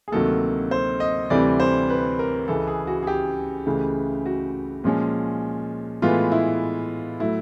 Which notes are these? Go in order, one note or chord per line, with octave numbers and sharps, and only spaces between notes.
G#4
D2 C3 D#3 F#3 A#3 A4
C5
D#5
D2 C3 E3 G3 C4 D5
C5
B4
A#4
C#2 C#3 E3 A4
G#4
F#4
G#4
G4
C#2 C#3 E3 A3
F#4
A#2 F3 G#3 C#4
A2 E3 G#3 B3 F4
E4
A2 F#3 A3 E4